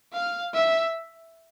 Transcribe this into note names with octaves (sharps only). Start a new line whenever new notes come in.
F5
E5